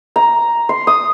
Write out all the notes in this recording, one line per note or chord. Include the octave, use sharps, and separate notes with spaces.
A#5
C6
D#6